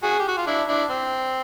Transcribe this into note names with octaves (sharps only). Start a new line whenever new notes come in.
F#4 G#4
G4
F#4
F4
D4 E4
D4 E4
C4